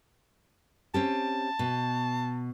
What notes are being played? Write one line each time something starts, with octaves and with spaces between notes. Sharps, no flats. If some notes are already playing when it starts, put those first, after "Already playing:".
C4 C#4 G4 A5
B2